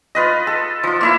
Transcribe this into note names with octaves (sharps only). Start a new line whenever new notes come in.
F4 B4 D#5
A4
F3 F4
A#3 E4 E5